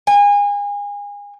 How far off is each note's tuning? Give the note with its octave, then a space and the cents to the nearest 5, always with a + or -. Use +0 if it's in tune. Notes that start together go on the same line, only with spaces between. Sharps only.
G#5 -30